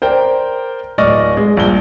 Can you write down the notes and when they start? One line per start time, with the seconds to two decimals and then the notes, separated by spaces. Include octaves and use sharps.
0.02 A#4 C5 D5 G5
0.98 D1 D5 D#5 C#6 F6 A#6
1.37 G#3
1.57 A#1 G2 G7